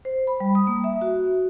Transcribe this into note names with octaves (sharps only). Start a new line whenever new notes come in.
C5
B5
G3
D#6
A#3
E5
F#4